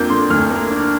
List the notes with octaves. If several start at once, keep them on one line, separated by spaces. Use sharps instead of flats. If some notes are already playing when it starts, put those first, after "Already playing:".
Already playing: F2 A#3 D4 G6
D3 C6
D2 F6
A#3
D4